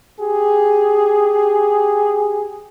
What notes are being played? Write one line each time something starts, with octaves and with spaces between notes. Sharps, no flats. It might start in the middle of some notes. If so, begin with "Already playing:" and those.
G4 G#4